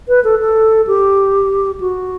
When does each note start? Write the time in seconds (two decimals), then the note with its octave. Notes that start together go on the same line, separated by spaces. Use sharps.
0.08 B4
0.24 A4
0.40 A4
0.87 G4
1.80 F#4